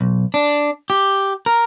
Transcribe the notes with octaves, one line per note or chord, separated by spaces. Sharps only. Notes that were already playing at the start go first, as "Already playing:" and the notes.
B1
D4
G4
A#4